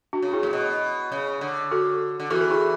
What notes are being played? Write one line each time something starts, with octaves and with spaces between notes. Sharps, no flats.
D4 F#4
C#3
E4 G#4
A2
B2
C#3
D3
F#4 A4
D3
E2 E3 F#4 A4
A4
E4 G#4